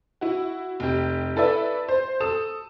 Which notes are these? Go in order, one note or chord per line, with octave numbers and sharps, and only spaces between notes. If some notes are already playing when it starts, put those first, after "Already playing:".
E4 F#4
F1 G4
E4 A4 B4 D5 E5
C5
A4 D#6 E7